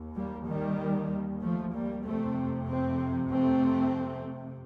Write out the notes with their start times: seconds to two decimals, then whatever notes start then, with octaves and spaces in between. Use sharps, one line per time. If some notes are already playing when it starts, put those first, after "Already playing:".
Already playing: D#2
0.16 G3 A#3
0.47 D#3 G3
1.41 F3 A3
1.73 G3 A#3
2.04 F2 C3 A3 C4
2.68 A3 C4
3.31 A3 C4